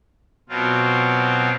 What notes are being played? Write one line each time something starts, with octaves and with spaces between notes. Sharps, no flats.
B2 F#3 C4 F4